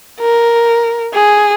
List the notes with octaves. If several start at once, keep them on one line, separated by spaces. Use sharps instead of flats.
A#4
G#4